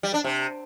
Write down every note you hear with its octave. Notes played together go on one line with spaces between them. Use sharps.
G3
D4
C3